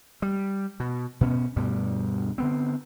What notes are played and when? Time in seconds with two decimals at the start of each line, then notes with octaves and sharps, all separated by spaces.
0.22 G3
0.80 B2
1.21 B2 B3 C#4
1.56 D2 G2 B2 G3
2.38 D3 B3 C4